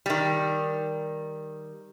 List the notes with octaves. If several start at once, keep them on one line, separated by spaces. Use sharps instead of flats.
D#3 G3